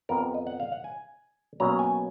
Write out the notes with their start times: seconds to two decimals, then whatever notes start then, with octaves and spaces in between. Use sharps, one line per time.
0.09 F2 F3 B3 A#4
0.34 D#5
0.47 F#5
0.60 F5
0.72 F#5
0.84 G#5
1.60 B2 F#3 A#3 C#4 A#5
1.79 G#5